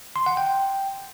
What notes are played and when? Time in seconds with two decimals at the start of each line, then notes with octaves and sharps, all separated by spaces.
0.16 C6
0.26 F#5
0.37 G5